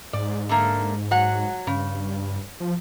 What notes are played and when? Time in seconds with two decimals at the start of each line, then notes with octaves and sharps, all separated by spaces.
0.13 G#2 D5
0.49 D3 A3 A#3
1.11 F#3 F#5
1.67 G2 C#3
2.60 F3